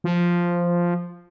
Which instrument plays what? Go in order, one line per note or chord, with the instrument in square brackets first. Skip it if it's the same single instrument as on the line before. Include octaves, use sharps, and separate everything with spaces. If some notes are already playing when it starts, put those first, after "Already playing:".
[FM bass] F3